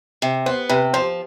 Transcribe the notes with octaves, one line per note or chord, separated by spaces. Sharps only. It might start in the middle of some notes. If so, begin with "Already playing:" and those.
C3
B3 C5
C3 B4
F3 C5